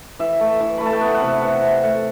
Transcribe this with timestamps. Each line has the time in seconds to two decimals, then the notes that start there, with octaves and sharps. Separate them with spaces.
0.19 E3 E5
0.40 A3
0.60 E3
0.78 A3 B5
0.86 A5
0.93 G5
1.01 B3 F#5
1.14 F#5
1.21 C3
1.28 E5
1.42 E3 F#5
1.62 C3
1.83 A3 F#5